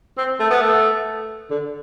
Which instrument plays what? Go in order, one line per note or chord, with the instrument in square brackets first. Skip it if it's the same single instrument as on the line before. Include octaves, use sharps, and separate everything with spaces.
[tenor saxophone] C4
A3
B3
A3
D3